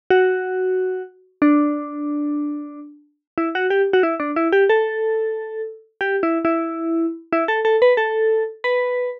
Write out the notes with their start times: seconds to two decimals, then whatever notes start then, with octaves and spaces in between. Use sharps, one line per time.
0.10 F#4
1.42 D4
3.38 E4
3.55 F#4
3.70 G4
3.93 F#4
4.03 E4
4.20 D4
4.36 E4
4.53 G4
4.70 A4
6.01 G4
6.23 E4
6.45 E4
7.33 E4
7.48 A4
7.65 A4
7.82 B4
7.97 A4
8.64 B4